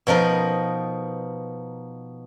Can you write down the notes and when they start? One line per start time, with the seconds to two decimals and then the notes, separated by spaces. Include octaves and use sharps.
0.07 B2 F3 D#4 A#4